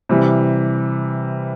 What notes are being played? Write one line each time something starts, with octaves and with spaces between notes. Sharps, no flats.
C3 E3 G3